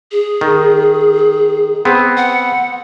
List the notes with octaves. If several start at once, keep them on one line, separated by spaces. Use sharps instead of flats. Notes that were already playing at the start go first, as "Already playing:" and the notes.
G#4
D#3
B3 C4
F#5